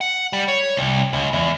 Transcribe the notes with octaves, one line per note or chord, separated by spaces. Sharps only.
F#5
G3
C#5
C2
C#2
E2